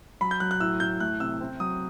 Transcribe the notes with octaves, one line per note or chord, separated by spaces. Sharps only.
F#3 B5
G6
F#3 F#6
F#6
A2 E6
A2 G6
A3 F#6
C3 E6
C4
F#3 D#6